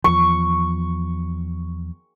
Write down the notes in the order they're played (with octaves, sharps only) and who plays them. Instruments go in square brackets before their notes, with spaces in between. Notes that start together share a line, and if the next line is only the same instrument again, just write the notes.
[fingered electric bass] E2 F3 [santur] C#6